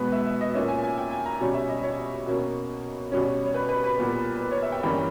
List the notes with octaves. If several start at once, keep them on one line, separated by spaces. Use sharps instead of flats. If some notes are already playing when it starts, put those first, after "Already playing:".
Already playing: B2 G#3 B3 B4
E5
E5
D#5
A#2 A#3 C#4 E5
G#5
G#5
G5
G#5
A#5
B2 G3 C#4 G#5
E5
D#5
C#5
B2 A#3 C#4
B2 G3 C#4
C#5
B4
B4
B4
A#2 G3 B3
B4
C#5
E5
G5
G2 E3 G3 A#3 C#4 G5